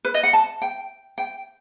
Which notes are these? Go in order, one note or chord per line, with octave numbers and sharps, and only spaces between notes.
B4
D#5
F#5
A5
G5
G5